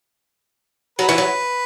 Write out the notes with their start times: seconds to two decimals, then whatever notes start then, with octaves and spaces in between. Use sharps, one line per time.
0.99 F#3 B4
1.09 E3
1.18 F#3